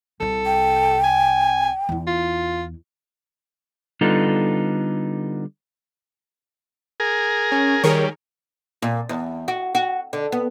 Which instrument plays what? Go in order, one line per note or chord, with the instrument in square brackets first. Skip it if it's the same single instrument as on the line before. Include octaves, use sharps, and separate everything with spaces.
[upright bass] C2 C3 [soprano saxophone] A4
[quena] G5
[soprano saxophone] G#5
[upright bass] E2 E4
[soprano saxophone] F4
[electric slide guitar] D3 G3 B3 D#4 F4 A4
[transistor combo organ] G#4 A#4
[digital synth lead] C#4
[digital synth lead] D#3 [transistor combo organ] G3 [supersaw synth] G#4 A#4 C#5
[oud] A#2
E2
F#4
F#4
D3
B3